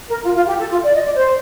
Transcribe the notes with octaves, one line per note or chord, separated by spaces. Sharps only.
A#4
F4
F4
G4
A4
F4
D5
D#5
D5
C5